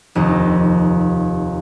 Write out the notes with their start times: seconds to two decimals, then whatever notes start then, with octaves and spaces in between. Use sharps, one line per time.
0.15 F1 D#2 D#5